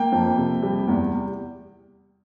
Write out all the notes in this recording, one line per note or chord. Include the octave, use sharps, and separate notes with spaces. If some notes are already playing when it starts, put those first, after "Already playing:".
Already playing: A#3 G5
F2
C3
G3
E2